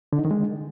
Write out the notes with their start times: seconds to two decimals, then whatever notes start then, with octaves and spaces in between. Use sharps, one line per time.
0.13 D3
0.19 D#4
0.25 D#3
0.31 G#3